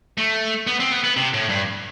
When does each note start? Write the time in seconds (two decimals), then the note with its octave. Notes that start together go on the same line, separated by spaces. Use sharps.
0.18 A3
0.67 B3
0.80 C4
0.92 B3
1.04 B3
1.17 C3
1.34 A2
1.49 G2